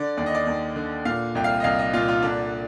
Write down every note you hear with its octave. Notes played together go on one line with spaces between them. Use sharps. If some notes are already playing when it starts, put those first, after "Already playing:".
Already playing: D3 D5
D#2 D5
D#5
D5
D#2
D3
A#2 F5
C2 G5
F5
D#5
C2 F5
D#5
A#2 F4
F4
D3 D4